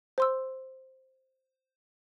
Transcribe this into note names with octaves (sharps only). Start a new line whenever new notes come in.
C5 C6 E6